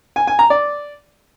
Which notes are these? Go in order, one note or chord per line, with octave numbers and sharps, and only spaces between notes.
G#5
G#5
A#5
D5